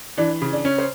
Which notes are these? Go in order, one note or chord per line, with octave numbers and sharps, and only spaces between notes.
E3 D4 D5
C#3
D4 D5
C#4
C5